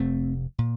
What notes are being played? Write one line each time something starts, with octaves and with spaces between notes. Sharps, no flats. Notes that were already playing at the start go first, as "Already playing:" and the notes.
Already playing: F1 F2 C3 A3 C4
A#2